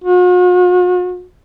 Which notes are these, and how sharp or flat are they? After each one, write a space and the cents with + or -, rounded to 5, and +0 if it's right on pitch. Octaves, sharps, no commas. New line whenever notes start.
F#4 -45